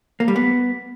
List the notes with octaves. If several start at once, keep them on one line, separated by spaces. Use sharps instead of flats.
A#3
G3
B3